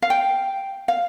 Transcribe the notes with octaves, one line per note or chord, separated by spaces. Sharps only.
F5
G5
F5